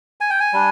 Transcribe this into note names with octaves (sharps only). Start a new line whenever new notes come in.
G#5
G5
G#5
G3 D4